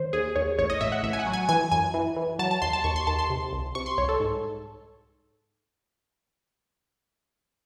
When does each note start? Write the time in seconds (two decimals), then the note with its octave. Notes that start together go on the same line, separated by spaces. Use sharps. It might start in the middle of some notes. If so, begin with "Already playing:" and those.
Already playing: D#3 C5 C#5
0.13 D#2 G#4
0.36 D#2 C#5
0.58 A1 C#5
0.70 D#5
0.81 A2 E5
0.92 F#5
1.03 A1 E5
1.13 G#5
1.19 F#5
1.26 F#3
1.33 G#5
1.49 E3 G#5
1.71 F#2 G#5
1.94 E3
2.16 E3
2.39 F#3 A5
2.51 A5
2.62 D#2 C6
2.73 A5
2.84 D#2 C#6
2.96 C6
3.07 D#2 A5
3.19 C6
3.30 C3
3.53 C2
3.75 C3 C#6
3.86 C6
3.98 C2 C#5
4.09 A4
4.20 G#2